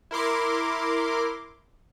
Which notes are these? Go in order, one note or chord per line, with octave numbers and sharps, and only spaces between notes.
E4 A#4 C6 D6